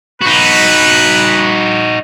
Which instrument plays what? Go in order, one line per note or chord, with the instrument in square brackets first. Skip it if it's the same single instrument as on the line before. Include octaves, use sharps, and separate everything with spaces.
[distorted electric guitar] D#4 F#4 [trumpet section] B4